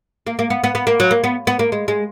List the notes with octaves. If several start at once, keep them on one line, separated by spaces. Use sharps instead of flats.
A#3
A#3
B3
B3
B3
A#3
F#3
A#3
B3
B3
A#3
G#3
G#3